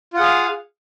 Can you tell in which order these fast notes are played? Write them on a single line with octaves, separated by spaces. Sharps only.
F4 F#5 G#4 F5